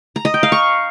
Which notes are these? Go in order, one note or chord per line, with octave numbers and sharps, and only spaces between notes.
A#5
D#5
G5
F5
C#6